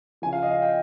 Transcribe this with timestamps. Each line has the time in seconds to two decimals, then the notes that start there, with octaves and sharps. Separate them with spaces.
0.22 C#3 F3 G#5
0.33 F5
0.43 D#5
0.52 F5
0.62 G5